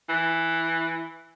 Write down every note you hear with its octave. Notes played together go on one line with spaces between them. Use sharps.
E3